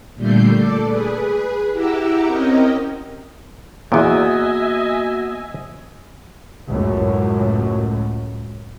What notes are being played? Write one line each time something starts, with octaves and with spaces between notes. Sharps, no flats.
A#2 D3 G3 A3 G6 C7
A4 D5 D6
G#4 B4
E4 G4 F#5 A#5 D6 E6
C4 C#4 A#4 D#5 G5
E2 A#2 A#3 B3 F#4 D#5 E5 G#5
C#2 F#2 A2 F#3